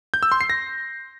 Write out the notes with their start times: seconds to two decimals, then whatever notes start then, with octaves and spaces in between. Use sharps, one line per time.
0.14 G6
0.23 E6
0.32 C6
0.41 C7
0.50 A#6